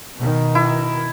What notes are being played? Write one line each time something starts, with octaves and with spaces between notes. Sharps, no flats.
B2 D#3
E4